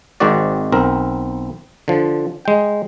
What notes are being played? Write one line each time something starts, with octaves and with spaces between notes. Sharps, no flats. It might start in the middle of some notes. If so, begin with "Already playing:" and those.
G#1 G#2 D#3 C4 F#4 D5
B1 C4 A#4
D3 F3
G#3 G5